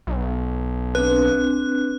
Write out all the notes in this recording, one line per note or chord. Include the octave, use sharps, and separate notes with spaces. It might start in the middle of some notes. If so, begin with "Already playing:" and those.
B1
C4 D4 B4 F#6